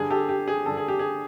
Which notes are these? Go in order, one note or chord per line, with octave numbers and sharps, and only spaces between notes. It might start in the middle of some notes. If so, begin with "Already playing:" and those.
Already playing: G2 D3 G3 G#4
G4 A4
G4
G#4
G2 D3 G3 A4
G#4
G4
G#4